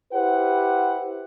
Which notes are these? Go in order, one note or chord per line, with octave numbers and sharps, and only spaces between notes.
E4 G4 B4 C5 F#5